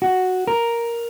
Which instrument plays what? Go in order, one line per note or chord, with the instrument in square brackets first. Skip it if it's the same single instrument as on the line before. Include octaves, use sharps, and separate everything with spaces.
[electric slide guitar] F#4
A#4